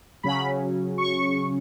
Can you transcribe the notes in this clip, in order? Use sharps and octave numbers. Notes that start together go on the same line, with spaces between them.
C#3 F#3 C#4 B5
C#6